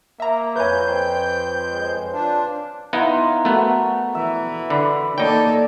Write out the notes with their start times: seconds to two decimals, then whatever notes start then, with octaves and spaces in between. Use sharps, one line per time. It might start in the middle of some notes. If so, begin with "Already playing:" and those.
0.20 A#3 E5 A#5
0.56 F2 B4 C#5 G#5 G6
0.88 C5 G5
1.73 G#3
2.12 D4 F4
2.93 B3 D#4 E4 F5 A#5 C6
3.45 A3 B3 F#4 A#4 C#6
4.15 E3 E5
4.70 D3 B5
5.18 A#3 D#4 A4 C#5 D5 G5